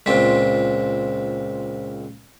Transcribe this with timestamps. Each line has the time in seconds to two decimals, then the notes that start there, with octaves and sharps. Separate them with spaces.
0.06 C#2 A#2 C4 C5 B6